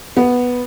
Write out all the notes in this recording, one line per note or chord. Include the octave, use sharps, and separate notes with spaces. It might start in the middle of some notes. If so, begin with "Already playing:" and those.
B3